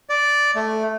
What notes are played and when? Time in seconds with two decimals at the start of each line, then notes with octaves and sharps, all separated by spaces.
0.09 D5
0.55 A3